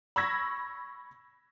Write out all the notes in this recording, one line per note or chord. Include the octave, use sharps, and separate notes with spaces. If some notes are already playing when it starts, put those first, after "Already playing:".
B5 C#6 E6 G#6 A#6 B6